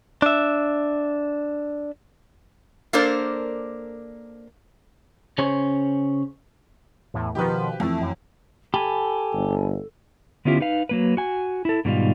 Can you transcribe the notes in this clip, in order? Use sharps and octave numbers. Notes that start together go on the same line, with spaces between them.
D4 E5
A#3 D4 A4 A#4 C5 D5
C#3 C#4 G#4 C5 C#5
E2 A2
B2 D#3 F3 G4 B4
F2 E3 A3
F#2
G4 A4 G#5 A5 B5
G1
D3 B3 C#4 E4 F4 G4
D#4 B4 F5
F#3 A#3 B4
F#4 G#5
E4 A4
G#2 B2 D#3 G3 D#4 F4